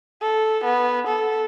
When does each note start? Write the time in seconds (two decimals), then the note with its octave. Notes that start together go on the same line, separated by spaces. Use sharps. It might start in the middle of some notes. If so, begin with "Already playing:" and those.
0.22 A4
0.65 B3
1.07 A4